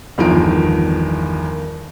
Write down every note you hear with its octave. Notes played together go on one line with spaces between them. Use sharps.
G1 E2 D#3 F3 A#4 D7